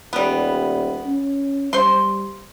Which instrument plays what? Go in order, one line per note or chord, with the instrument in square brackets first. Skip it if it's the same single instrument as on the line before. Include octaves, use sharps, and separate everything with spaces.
[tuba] D#1 [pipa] G3 B3
[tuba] C#4
[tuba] G3 [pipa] C5 C6